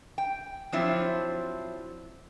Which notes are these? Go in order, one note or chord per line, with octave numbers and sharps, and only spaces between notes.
G5
F3 F#3 C4 D4 E4 F4